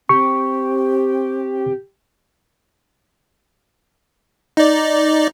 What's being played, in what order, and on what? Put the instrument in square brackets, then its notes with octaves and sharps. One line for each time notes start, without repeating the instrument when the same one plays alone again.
[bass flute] C4 [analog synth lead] G4 [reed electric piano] C#6
[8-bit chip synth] D#4 D5